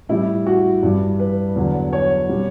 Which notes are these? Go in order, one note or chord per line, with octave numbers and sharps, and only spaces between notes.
A2 E3 G3 E4
F#4
G2 E3 G3
B4
E2 D3 F#3
C#5
B2 G3